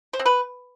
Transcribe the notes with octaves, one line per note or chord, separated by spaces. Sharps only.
C5
C4
B4